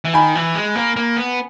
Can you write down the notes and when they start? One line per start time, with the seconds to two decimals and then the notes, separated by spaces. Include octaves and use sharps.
0.04 E3
0.13 D#3 G#5 B5
0.35 E3
0.55 G#3
0.75 A#3
0.96 A#3
1.17 B3